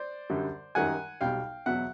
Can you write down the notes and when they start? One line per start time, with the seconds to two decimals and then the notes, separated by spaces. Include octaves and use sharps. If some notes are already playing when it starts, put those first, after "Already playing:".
Already playing: C5 D5
0.30 F#2 D3 G3
0.75 F#2 D#3 G3 F#5 G#5
1.21 B1 B2 G3 F5 G5
1.66 E2 B2 F#3 E5 F#5